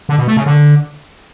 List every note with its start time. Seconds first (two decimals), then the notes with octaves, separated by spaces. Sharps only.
0.09 D3
0.18 B2
0.27 A3
0.37 C#3
0.46 D3